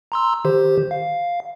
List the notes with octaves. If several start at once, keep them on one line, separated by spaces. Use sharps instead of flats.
A#5 C6 E6
D#3 G4 C5
F5